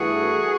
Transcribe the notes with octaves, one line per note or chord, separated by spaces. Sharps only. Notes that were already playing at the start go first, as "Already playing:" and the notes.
Already playing: G2 E3 A3 F#4 G#4